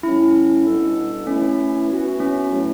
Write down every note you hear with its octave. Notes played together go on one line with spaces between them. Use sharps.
A2 G3 C#4 E4
B2 G3 B3 D4 A4
E3 A3 C#4 E4
C#4
E3 B3 F#4 B4
C#4
A2 F#3 A3 E4